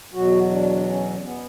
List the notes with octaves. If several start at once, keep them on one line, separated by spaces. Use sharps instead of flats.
E2 B2 F#3 F#4
D4
C#4
B3